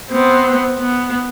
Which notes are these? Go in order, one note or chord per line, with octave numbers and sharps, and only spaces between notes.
B3 C4
B3